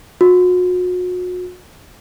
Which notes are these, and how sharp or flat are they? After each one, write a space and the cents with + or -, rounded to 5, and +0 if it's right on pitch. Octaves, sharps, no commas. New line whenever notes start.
F#4 -40